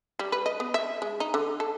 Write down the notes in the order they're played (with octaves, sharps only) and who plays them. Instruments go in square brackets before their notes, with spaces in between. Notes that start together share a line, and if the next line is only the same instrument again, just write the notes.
[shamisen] G3
B4
D#5
B3
E5
G#3
D#4
D3
A4